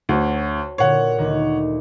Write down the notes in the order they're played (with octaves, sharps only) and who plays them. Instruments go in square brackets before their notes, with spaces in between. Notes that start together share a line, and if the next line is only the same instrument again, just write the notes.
[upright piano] D2 [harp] F#4 C#5
[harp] A#2 D3 [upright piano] C#5 F#5
[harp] D2 D#3